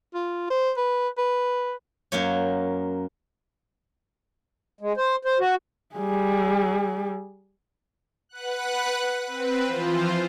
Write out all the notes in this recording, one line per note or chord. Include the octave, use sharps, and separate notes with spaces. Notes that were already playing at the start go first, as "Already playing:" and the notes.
F4
C5
B4
B4
F#2 A#3 C#5
G#3
C5
C5
F#4
G3 G#4
B4 F#5 F#6
C4 B4
E3 F3 F4 C5